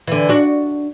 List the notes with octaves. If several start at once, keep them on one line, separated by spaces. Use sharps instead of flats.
D3 E3
D4 F#4